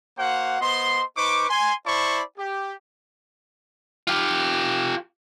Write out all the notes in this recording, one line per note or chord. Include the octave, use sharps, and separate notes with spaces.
A#3 F#4 C5 F5 F#5
B3 C5 D#5 C6
D#4 B4 C5 C#6 D6
G#5 C6
E4 C5 D5 A5 B5 C#6
G4
F4 G4